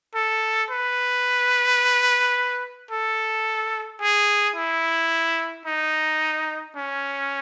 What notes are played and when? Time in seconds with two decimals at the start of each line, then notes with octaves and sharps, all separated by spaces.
0.15 A4
0.70 B4
2.91 A4
4.01 G#4
4.56 E4
5.66 D#4
6.76 C#4